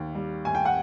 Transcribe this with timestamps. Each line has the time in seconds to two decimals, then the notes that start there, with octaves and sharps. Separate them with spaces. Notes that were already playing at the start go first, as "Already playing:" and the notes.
Already playing: D#2 D#3
0.15 G3
0.45 D#2 G#5
0.55 G5
0.65 F#5